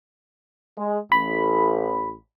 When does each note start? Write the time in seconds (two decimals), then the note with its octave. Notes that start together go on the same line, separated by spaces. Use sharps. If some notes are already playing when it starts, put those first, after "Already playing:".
0.77 G#3
1.12 A1 B5